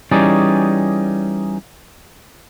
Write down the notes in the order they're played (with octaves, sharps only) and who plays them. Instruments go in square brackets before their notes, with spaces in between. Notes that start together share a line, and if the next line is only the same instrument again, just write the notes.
[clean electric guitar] E3 G3 C#4 D#4 G#4 D5